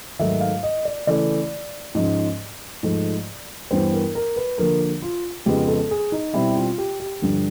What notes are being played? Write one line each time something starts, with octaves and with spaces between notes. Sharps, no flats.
G#2 D#3 F#3 A3 E5
F5
D#5
D5
C#3 E3 A3 D5
G#2 F3 G#3 C#4
G#2 F3 A3
G2 E3 G3 B3 C5
A#4
A#4
B4
D3 F3 A#3 A#4
F4
F2 C#3 F3 G#3 B3 G4
A4
G#4
D#4
B2 G3 C4 E4
F4
G4
G4
G2 D3 F3